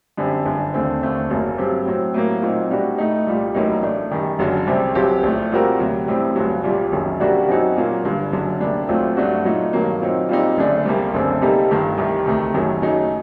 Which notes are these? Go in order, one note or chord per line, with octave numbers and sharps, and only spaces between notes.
F#2 D3 G3 C4
G1 F#2 D3
D#2 D3 A3 C4
D#2 D3 A3 C4
F#1 F#2 F#3 A#3
G2 F#3 C4 G4
A2 F#3 C4
A2 F#3 A#3
A#2 F#3 C4 D#4
A2 G3 D4 F#4
A2 A3 D#4
C2 A#2 G3
A1 A2 F#3 A#3 D#4
A2 A3 D4
F#2 D#3 G3
F#1 F#2 D3 F#3
C2 C3 G3 C4
G1 G2 F#3 C4 G4
A#1 A2 A3
A#2 G3 C4 F#4 A#4
D2 C3 F#3
A1 A2 G3 C4
G1 G2 F#3
C2 A#2 G3
F#1 F#2 D#3 F#3
C3 G3 A#3 D4 F#4
F#2 F#3 C4 D#4 F#4
A#2 F#3 A#3
G1 G2 D3
F#1 F#2 D3 F#3
D2 C3 G3 A#3 D4
A#1 A#2 F#3 A3 C4
G2 F#3 A3 D4 F#4
A#2 F#3 A3 D#4
G2 D#3 F#3 A#3
A#2 F#3 C4 D#4
A#2 G3 C4 D#4
F#1 F#2 D3 A3 D4
C2 C3 G3 A#3
F#1 F#2 D3 A3 C4
C3 G3 A#3 D#4 A4
G1 G2 D#3 A3
C2 C3 D#3
D2 C3 D#3 A3
F#1 F#2 D#3 F#3
F#1 F#2 F#3 A3 D#4